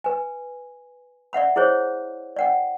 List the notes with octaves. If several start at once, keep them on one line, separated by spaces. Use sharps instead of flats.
B4 G#5
D5 E5 F#5 B5
E4 G#4 C5 C#5
D5 F#5 G5